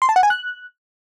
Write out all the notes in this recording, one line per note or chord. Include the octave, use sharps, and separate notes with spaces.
C6
A5
F#5
G#5
F#6